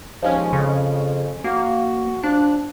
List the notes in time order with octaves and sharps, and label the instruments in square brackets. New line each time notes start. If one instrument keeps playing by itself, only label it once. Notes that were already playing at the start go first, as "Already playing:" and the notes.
[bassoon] D#2 [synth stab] F3 G#3 C#4
[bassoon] F2 [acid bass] C#3
[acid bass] A#3 [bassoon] F#4
[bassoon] F3 [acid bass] D4 [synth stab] F#6